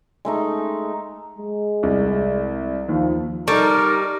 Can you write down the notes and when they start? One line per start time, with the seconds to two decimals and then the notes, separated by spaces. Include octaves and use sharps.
0.25 G#3 A3 D#4
1.39 G#3
1.83 C2
2.89 D#2 F3
3.48 G3 D#4 A4 A#4 D5 C#6